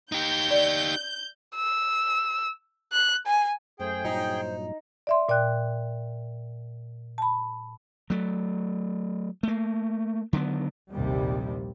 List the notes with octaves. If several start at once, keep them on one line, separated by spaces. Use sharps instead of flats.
D#4 G4 G6
D5
E6
F#6
G#5
F#2 A3 G#4 C5 G5
G2 A#2 F#3 D#4
D5 E5 C6
A#2 D5 G5 F#6
A5 B5
F#3 A3
A3 A#3
D3 D#3 F#3 B3
A#1 D#2 C3 G3